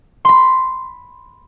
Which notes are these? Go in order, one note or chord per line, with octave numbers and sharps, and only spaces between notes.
B5 C6